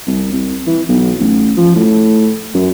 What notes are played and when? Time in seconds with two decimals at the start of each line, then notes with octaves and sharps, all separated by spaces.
0.07 C2
0.33 C2
0.66 E3
0.89 B1
1.20 A1
1.57 F3
1.75 A2
2.54 F#2